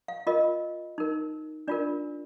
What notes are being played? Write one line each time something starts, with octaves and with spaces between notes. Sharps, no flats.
F5
F4 A#4 D#5
D#4 A#4
D4 F4 A#4 D5